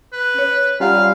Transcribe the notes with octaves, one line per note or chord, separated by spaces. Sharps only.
B4
C#4 C#5
G3 C#4 F4 D5 F5 F#5 A#5